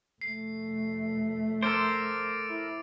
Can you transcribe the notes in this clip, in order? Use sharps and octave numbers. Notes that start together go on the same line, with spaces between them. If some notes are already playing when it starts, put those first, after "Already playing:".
F1 A3 C7
A4 A#4 C5 D6 A6 D7
E4